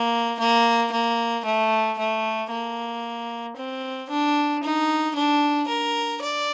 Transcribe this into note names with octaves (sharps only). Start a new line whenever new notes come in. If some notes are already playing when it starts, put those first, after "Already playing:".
Already playing: A#3
A#3
A#3
A3
A3
A#3
C4
D4
D#4
D4
A#4
D5